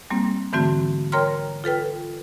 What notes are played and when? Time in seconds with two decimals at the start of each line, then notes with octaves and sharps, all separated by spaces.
0.10 G3 A#3 C4
0.53 G#2 D3 E3 A3 C4 F#4
1.12 A#4 C#5 G5 A#5 C6 F6
1.64 F4 A4 B4 G5